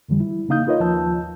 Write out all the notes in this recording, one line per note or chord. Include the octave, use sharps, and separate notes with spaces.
F2 D3 E3 G3
E4
C#3 A#3 D#4 F5 D#6 G6
D#4 F4 A#4 B4 C#5 D#5
D#2 F3 F4 A5 E6 G6